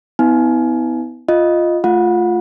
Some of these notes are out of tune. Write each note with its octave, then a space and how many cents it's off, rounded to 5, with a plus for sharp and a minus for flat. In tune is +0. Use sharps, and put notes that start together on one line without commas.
B3 +25 E4 -40 G#5 +25
F4 +0 D#5 +0
A3 +0 F4 +0 F#5 -30